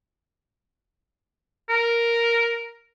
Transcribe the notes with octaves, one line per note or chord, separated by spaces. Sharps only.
A#4